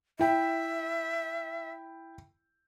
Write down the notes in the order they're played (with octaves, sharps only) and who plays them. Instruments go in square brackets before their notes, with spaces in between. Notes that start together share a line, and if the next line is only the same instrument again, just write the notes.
[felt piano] E4 G5 [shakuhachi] E5